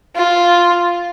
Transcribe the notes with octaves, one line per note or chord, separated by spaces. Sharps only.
F4